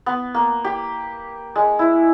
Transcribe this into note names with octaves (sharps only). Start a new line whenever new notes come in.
B3
A#3
G4
G#3
E4